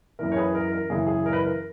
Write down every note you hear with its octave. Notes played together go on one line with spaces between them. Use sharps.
F#2 E3 A#4
C#5
G#4 B4
A#4
A#4
F#2 C#3 E3 G#4
G#4
A#4
B4
A#4